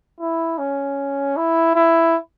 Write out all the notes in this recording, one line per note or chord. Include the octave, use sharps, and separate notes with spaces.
E4
C#4
E4
E4